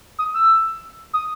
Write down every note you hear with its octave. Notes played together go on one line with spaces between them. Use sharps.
D#6
E6
D#6